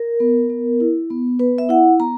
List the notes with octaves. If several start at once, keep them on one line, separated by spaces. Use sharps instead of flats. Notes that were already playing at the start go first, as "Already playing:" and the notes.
Already playing: A#4
B3
B3
E4
B3
B3 B4
E5
E4 F#5
B3 A#5